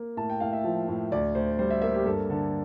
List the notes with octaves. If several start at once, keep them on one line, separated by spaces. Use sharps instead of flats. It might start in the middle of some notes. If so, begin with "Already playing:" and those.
Already playing: A#3
A2 A5
G5
A2 F5
E5
F3
A2
D2 D5
D2 C5
G3 C5
E5
A#3 E5
G4
G2 A4
D3 A4